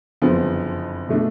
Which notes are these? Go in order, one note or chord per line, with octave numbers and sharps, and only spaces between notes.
F#1 F2 D3 F3 B3
B2 A3 D4